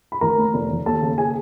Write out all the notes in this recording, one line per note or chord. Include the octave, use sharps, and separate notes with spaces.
B5
A1 A#4 A#5
A2
F1
E2
D#2 A4 A5
C#3
G#4 G#5